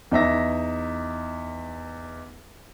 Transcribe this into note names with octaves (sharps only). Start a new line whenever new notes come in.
E2 D#4 E5 A#6